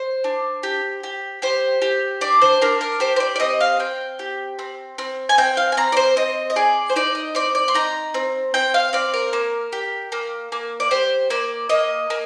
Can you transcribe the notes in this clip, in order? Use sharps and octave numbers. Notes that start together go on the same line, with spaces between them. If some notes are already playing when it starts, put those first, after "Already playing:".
Already playing: C5
D4
G4
G4
G4 C5
G4
D4 D5
C5
D4 A#4
A#4
G4 C5
C5
D5
D5
C4 D#5
F5
C4 G5
G4
C4
C4
G#5
C4 G5
F5
G#5
C4 A#5
D5
C5
C4 D#5
D#5
G#4 D5
C5
D#4 D5
D#5
C4 D5
D5
C6
D#4 A#5
C4
C4 G5
F5
C4 D5
A#4
A#3
G4
A#3
A#3
D5
G4 C5
A#3 D5
A#3 D#5
A#3